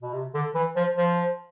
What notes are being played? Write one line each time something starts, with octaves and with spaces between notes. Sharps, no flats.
B2
C3
D3
E3
F3
F3